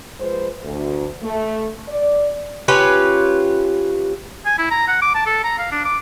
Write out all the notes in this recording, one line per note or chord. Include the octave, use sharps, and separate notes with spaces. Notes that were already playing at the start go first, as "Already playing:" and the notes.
F3 G#3 B4 C5
D2
A3
D5
C#4 F4 G4 B4
G#5
E4
A#5
F#5
D6
A5
A4
A#5
F5
D4
D6